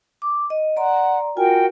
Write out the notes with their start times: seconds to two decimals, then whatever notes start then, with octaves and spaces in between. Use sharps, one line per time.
0.22 D6
0.50 D#5
0.77 D5 F#5 A#5 C6
1.37 F4 F#4 A#4 G5 G#5